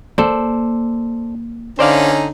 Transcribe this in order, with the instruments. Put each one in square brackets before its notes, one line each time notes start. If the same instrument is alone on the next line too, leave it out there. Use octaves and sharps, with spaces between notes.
[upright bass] A#3 [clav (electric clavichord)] A4 C5 D5
[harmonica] D3 C#4 D#4 [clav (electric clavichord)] C5 D5 F5